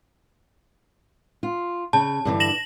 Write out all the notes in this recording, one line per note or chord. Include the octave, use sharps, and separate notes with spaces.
F4
C#3 A5
G2 D3 E3
A#6 E7 F#7